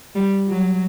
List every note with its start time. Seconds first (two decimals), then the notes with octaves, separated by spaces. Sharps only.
0.15 G3
0.48 F#3